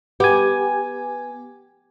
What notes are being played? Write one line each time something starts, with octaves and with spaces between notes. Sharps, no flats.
B3 G4 G#5